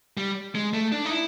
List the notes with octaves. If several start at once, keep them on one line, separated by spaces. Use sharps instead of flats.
G3
G#3
A3
D4
D#4
E4